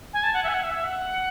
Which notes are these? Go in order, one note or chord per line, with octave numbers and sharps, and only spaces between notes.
G#5
A5
F#5
E5
G#5
F#5
E5
E5
F#5